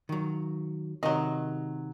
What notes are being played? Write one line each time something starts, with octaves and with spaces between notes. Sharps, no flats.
D#3 F#3
C3 D#3 F#3 D#5